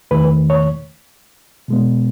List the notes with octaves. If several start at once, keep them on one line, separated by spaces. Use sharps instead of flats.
E2 D#3 A3 B4
C#5
B2 G#3 B3